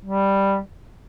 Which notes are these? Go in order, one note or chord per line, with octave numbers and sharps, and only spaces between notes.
G3